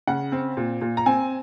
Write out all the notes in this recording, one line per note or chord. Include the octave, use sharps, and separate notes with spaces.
C#3 F#5
C4
A#2
A#2
A#5
C4 G#5